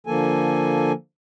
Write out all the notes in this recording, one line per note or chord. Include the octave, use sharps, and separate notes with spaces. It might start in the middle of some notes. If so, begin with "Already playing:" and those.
D3 F3 A#3 A4 G#5